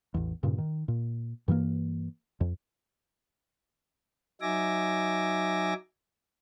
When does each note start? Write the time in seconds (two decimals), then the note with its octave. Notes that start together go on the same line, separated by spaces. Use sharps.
0.14 A1 E2
0.43 G2 A#2 C#3
0.58 D#3
0.88 A#2
1.48 G2 E3 F3 A#3
2.41 F2
4.41 F#3 D#4 E5 G#5 D6 A#6